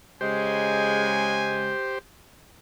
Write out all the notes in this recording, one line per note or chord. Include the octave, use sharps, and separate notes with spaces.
C#3 G#3 G4 C5 G#5